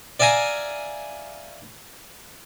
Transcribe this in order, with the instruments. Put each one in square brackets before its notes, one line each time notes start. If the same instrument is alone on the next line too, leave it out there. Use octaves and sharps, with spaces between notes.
[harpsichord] D5 E5 F5 G#5 A#5